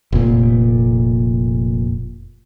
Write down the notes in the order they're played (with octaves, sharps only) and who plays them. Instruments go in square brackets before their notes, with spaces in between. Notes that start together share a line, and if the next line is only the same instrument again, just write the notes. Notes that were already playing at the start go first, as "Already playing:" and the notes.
[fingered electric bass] F1 A#2